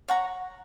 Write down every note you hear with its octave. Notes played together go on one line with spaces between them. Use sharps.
C#5 F#5 A#5